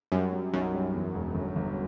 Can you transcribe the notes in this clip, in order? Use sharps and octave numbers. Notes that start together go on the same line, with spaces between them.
F#2 G3
G3
B1 F#2
G3
E2
E1
G1
G1